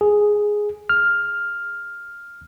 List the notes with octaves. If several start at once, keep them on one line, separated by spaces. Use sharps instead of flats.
G#4
F6